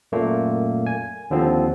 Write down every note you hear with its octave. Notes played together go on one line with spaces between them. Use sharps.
F#2 A#2 A3 A#3
G#5
D#2 D3 F3 C4